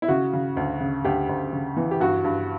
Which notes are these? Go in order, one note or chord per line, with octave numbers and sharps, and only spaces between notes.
E4
C#3 F#4
C#3
D2
C#3
D2 G4
D2
C#3
E3
G4
G2 F#4
G2